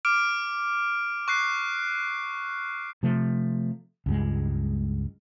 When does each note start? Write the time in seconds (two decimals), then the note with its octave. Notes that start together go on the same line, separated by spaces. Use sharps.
0.05 D6 F6 D7
1.28 C#6 F#6 C7
3.03 C3 F3 A3
4.06 C#2 G2 G#3